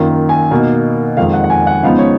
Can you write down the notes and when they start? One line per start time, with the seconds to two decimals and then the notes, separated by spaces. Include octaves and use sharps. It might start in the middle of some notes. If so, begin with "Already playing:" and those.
Already playing: F#2 D#3 A#3 F4
0.29 G#5
0.51 B2 A#3 D#4
1.17 F2 D#3 G#3 F5
1.34 F#5
1.44 F#5
1.50 G#5
1.67 F#5
1.83 C#3 F3 G#3 B3 D#4 F5
1.99 C#5